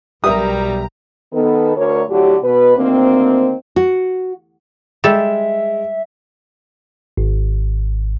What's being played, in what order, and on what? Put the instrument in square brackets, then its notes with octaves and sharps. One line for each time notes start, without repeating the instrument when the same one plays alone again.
[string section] B1 A#5 [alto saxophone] G3 [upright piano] G4 A#4 E5 [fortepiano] D#6
[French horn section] D#3 B3 A4
D2 A#4 C#5
A2 D3 F#3 F#4 G4
B2 B4
D2 D#3 A#3 C4
[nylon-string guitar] F#4
[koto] G3 A4 [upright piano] G#3 E7 [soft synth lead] E5
[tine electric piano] G#1